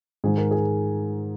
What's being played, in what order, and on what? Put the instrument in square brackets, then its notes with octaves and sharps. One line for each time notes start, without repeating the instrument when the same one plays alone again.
[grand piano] G#2 D#3 G#4
A#4
G#4